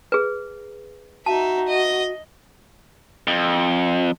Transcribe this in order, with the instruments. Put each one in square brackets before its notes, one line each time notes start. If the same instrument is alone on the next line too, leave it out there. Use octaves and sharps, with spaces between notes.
[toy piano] G#4 B4
[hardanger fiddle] D#4 E5 [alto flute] F#4 [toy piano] A5
[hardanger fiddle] D#5
[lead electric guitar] F2